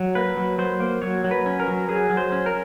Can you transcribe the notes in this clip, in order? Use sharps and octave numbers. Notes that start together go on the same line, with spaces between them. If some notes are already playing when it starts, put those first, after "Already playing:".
Already playing: F#3
A#3 B4
F#3
F#3 C5
A#3
F#3 C#5
F#3
B4
C#4
A#4
F#3
F#3 G#4
F#3
C5
C#4
A#4